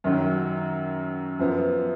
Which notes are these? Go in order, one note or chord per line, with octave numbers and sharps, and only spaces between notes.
F#2 D#3 F#3
F#2 F3 B3